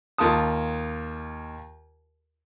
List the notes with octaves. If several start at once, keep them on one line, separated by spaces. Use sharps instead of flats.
D#2 F4 A5 D#6